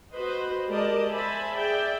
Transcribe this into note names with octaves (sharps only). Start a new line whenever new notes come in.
F#4 B4 C5 D#5
G#3 G4 A#4 D5 D#5 A5
C5 E5 G#5 A5 B5
G#4 D5 E5 G5